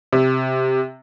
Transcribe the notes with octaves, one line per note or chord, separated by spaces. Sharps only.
C3